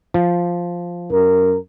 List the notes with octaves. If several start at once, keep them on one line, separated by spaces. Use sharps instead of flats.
F3
F#2 A#4